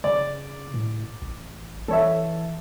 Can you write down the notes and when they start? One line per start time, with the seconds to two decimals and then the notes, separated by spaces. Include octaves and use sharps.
0.04 C#3 D5
0.74 A2
1.22 A1
1.88 E3 A4 C#5 E5